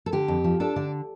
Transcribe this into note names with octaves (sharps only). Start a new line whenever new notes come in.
A4
D3 G4
F2
F3
D4 A4
D3 D5